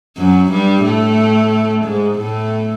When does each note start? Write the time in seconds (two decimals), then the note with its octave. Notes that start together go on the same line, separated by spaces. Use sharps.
0.17 F#2 F#3
0.51 G2 G3
0.84 A2 A3
1.84 G#2 G#3
2.18 A2 A3